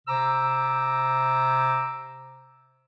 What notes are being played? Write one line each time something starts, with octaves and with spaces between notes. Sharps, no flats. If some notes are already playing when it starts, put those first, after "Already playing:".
C3 C5 A#5 D6 E6